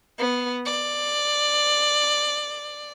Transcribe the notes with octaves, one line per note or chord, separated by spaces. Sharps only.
B3
D5